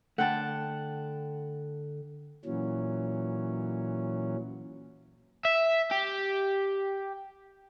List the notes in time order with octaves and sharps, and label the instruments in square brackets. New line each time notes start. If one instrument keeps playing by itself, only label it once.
[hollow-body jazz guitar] D3 A3 [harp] F#5 G5 A5
[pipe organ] A#2 E3 F#3 C#4
[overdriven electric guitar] E5
G4